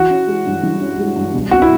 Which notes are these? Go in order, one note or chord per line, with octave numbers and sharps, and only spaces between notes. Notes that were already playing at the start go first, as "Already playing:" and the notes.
Already playing: E3 F#4
C#4
G#3
G2
E3
C#4
G#3
G2
B2
C4 F#4
E4